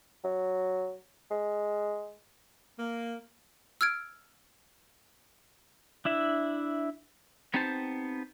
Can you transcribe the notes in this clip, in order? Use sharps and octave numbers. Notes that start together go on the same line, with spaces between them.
F#3
G#3
A#3
E6 F6 G#6 D7
D4 E4 E5
B3 C4 D#4 G4 C5 A5